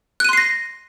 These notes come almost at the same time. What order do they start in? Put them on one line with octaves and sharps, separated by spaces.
F#6 D#7 C6 C7 A#6